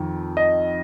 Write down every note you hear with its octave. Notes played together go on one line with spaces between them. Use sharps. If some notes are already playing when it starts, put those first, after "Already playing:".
Already playing: F2 D#3
D#5